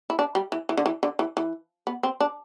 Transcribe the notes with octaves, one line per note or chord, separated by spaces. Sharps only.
E4
D4
G3
E3
E3
D3
E3
D3
E3
E3
B3
C4
D4